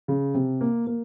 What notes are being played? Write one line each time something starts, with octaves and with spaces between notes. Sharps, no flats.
C#3
C3
A#3
A#3